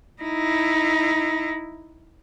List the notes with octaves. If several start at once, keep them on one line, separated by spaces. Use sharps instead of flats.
D#4 E4